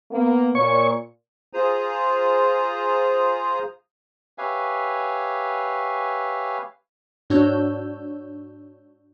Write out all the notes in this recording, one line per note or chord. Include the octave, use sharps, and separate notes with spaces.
A#3 B3
A#2 C#5 C#6
F4 G#4 C5 A#5 D#6
G4 B4 C#5 E5 F5 G#5
G#2 D4 F#4 C#5 E6 G6